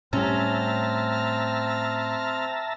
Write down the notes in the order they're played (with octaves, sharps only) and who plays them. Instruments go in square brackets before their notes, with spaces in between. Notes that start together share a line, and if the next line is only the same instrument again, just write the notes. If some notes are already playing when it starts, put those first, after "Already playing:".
[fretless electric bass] A2 G3 [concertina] C4 F6 [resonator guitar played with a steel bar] C#4 [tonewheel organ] E5 A5 A#5